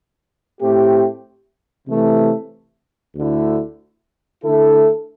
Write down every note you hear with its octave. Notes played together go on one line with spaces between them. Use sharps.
A2 A3 C4 G4
C3 E3 A3
D2 D3 A3 E4
D3 A3 E4 A4